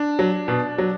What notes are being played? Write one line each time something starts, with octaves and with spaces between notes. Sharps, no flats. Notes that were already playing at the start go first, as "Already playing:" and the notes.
Already playing: D4
F#3
B2
F#3